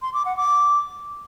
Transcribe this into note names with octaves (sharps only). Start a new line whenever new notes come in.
C6
D6
F#5
D6